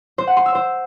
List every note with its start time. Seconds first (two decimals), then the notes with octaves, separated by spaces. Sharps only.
0.18 C5
0.27 F#5
0.37 C6
0.46 E6
0.55 C5